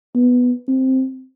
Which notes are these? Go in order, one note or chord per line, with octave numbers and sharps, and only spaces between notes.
B3
C4